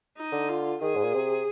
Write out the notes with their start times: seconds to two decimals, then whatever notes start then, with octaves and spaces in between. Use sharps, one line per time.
0.17 D#4
0.33 D3
0.49 F4
0.82 D#3 G#4
0.96 G#2
1.04 A#2
1.14 C3